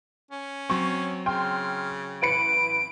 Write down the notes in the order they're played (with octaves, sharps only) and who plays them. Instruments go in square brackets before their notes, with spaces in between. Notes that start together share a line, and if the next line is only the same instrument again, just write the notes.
[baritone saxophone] C#4
[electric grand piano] F#3 C4 [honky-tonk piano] C#6
[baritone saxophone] C#3 [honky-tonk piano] G5 C6 [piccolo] F6
[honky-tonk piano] A1 B4 C#7 [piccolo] D7